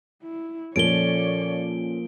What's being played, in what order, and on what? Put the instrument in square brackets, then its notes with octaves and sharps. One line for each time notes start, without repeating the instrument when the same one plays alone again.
[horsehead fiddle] E4
[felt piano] A#2 F3 [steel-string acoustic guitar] C#4 A4 [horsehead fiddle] C#5 D5 [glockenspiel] D7 G7